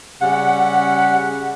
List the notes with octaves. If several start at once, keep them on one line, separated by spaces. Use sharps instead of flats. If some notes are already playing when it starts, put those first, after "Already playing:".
C#3 G3 F#5